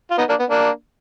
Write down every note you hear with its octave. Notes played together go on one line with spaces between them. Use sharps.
F4
B3 D#4
A#3 D4
B3
A#3 D4